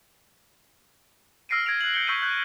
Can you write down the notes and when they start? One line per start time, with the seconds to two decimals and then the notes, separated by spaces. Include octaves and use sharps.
1.49 E6 F6 A#6 C7 D7 D#7
1.66 F6 G#6 A#6 D7 F7
1.81 F#6 F#7
1.94 G6 C#7 G7
2.07 C#6 E6 G6 B6 C7 D#7
2.22 F#6 G6